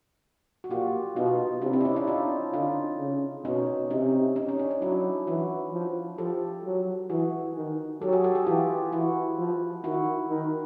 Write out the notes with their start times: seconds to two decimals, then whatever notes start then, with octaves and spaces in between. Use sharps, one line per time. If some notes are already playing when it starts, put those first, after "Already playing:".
0.64 F#4
0.71 A#2 F4 G4
1.16 B2 D#4 F4
1.62 C3 D4 E4
1.73 C4 D4
1.81 E4
1.85 C#4 D#4
1.96 D4 E4
2.07 D#4 F4
2.53 D3 D#4 F4
2.99 C#3
3.45 B2 C#4 D#4
3.90 C3 C#4 D#4
4.36 C#4 D#4
4.49 C#4
4.59 D4
4.71 D#4
4.82 F#3 D4 E4
5.27 E3 E4 F#4
5.72 F3
6.18 F3 G4 A4
6.64 F#3
7.10 E3 F#4 G#4
7.55 D#3
8.02 F#3 G4 A4
8.13 F#4 G#4
8.24 G4 A4
8.35 F#4 G#4
8.46 E3 F4 G4
8.92 E3 E4 F#4
9.38 F3
9.84 D#3 E4 F#4
10.29 D#3